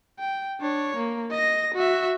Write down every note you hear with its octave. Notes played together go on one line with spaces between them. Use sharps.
G5
D4 C#5
A#3
D#5 A#6
F#4 E5